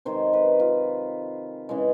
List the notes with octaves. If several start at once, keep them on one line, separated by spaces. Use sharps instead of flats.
C3 D#3 G#3 C5
B4
F4
C#3 E3 G#3